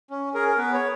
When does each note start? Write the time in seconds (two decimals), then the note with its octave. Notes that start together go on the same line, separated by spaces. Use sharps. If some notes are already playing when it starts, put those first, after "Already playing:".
0.11 C#4
0.34 G#4 A#4
0.48 A#4
0.58 B3 B4
0.73 C#5